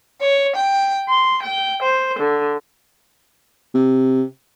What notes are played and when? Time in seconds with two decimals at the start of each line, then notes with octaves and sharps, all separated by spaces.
0.22 C#5
0.57 G5
1.08 C6
1.43 G5
1.82 C5
2.19 D3
3.75 C3